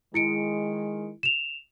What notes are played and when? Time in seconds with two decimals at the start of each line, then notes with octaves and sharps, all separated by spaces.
0.14 D#3 G#3 E4 C#7 D7
1.23 E7 F7